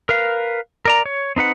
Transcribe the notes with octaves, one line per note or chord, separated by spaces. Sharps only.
A#4 B4 F5
A#4 D5 A#5
C#5
C4 D#4 B4 F#5